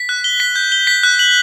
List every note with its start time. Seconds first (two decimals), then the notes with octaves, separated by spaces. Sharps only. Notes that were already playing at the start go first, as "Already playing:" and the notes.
Already playing: B6
0.09 F#6
0.24 G7
0.40 B6
0.56 G6
0.72 G7
0.87 B6
1.03 F#6
1.19 F#7